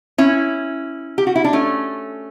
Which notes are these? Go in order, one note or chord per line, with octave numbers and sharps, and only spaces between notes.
C#4 E4
G4
F#4
E4
D4
A3 C#4